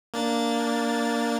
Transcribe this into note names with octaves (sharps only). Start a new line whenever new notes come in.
A#3 D4 A6